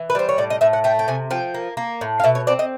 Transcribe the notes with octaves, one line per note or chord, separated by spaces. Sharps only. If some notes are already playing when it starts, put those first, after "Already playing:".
Already playing: E3
B4
G3 C5
C#5
A2 D5
D#5
A2 E5
F#5
A3 G5
G5
C3 G#5
F3 G5
A#3
A#3
A2
F5
B2 E5
C#5
C4 D5
D#5